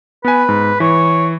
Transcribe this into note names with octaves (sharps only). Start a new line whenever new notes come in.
B3 B4 G#5
G#2
E3 C#5